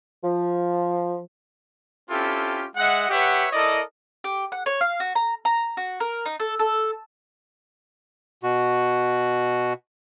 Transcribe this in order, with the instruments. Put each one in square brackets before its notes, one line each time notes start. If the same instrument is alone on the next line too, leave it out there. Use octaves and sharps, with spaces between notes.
[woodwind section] F3
[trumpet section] C4 C#4 E4 F4 G4 A4
G#3 D#5 E5 F#5
G4 B4 C#5 E5 F#5
E4 A4 A#4 D5 D#5
[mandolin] G4
F#5
C#5
F5
F#4
A#5
A#5
F#4
A#4
D#4
A4
A4
[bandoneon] B2 F#4